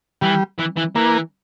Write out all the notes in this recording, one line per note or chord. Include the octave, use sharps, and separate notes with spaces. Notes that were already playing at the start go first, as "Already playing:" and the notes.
E3 G3
E3
E3
E3 A#3